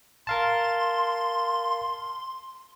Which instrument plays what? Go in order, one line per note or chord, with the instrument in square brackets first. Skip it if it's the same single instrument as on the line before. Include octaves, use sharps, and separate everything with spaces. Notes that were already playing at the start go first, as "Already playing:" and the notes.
[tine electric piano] A#4 F5 A5 [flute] C6